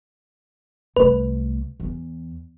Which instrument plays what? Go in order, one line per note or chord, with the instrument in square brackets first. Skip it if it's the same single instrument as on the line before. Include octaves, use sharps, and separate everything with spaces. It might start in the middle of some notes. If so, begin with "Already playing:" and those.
[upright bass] C2 A3 [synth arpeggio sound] B4
[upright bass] E2